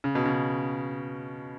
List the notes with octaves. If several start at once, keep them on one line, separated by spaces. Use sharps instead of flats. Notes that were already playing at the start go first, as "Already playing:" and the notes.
C#3
B2
C#3